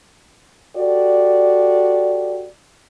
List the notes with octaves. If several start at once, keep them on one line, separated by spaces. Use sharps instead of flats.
F#4 G4 A4 D5